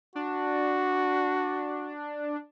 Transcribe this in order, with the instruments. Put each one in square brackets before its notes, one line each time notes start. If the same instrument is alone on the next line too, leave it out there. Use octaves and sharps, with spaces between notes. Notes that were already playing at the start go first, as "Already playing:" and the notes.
[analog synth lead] D4 [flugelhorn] F#4